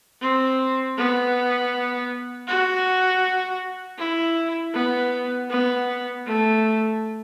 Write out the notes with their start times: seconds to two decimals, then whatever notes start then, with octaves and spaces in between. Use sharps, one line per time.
0.21 C4
0.97 B3
2.48 F#4
3.98 E4
4.74 B3
5.50 B3
6.26 A3